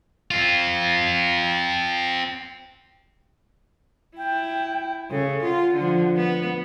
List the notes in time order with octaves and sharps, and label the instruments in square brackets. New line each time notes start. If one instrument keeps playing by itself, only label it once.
[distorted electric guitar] C4 F4
[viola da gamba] E4 [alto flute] G5
[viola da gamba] C#3 [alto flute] A4
[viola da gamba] F4 [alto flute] F#5
[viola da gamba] D3 F3
B3